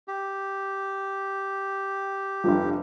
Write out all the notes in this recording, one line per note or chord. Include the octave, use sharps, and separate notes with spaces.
G4
F1 G2 F3